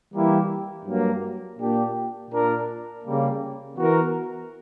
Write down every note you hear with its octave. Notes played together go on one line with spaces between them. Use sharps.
E3 G3 A#3 E4 G4
G2 F#3 A#3
A#2 A#3 D4 G4
A#2 A#3 D4 A#4
C#3 G3 A#3
E3 B3 F#4 A#4